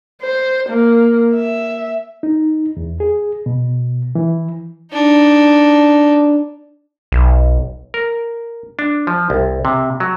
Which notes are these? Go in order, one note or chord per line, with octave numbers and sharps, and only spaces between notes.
C5
A#3
E5
D#4
E2
G#4
B2
E3
D4 D#4
B1
A#4
D4
F3
C2
C3
F#3